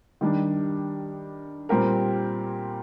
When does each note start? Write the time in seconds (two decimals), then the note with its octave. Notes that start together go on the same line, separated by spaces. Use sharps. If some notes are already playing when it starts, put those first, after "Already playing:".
0.21 D#3 G3 D4
1.69 A#2 G3 C4 G4 A#4